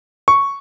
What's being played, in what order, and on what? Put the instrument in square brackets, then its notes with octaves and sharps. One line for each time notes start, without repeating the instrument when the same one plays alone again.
[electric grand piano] C#6